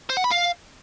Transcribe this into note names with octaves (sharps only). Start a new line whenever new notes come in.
C5
F#5
B5
F5